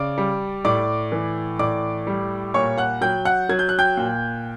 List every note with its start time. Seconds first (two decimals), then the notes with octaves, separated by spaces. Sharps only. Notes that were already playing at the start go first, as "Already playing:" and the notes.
Already playing: C#3 D5 D6
0.18 G3
0.65 A2 D5 D6
1.12 E3
1.59 A2 D5 D6
2.07 G3
2.54 A#2 C#5 C#6
2.78 F#5 F#6
3.01 F#3 G5 G6
3.25 F#5 F#6
3.49 F#3 G#6
3.59 G6
3.69 F#6
3.79 G5 G6
3.97 A#2